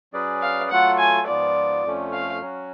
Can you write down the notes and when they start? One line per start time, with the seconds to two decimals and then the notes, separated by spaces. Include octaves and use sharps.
0.13 F#3 C#4 G#4 B4 D5
0.42 F5
0.70 F#3 A3 F4 A4 F#5
0.99 G#5
1.27 G#2 F3 B3 F4 D5
1.84 F2 F3 A3 C#4
2.13 F5
2.41 F#3 C#4 F#4